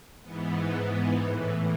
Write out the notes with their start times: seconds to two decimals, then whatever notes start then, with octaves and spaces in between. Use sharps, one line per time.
0.23 G#2 E3 B3
1.21 A2 E3